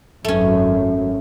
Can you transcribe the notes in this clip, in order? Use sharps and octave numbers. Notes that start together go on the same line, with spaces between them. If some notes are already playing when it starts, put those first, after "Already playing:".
G#1 F#2 A3 C#4